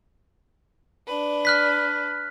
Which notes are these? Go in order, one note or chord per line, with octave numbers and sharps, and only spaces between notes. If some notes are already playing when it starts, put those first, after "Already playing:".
D4 B4
F6 F#6 B6